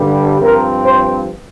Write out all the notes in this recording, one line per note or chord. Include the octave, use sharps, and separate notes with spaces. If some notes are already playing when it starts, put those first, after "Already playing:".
Already playing: G2 D3 G3
G2 F3 C4 A#4
C5